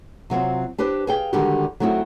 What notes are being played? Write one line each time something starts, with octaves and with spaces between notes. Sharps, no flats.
C3 F#3 C4 F4
D4 G4 B4 C5
G#4 F5 G5
D3 D#3 G3 G#3 F#4 G4
F#3 A3 C4 D#4 E4 F#4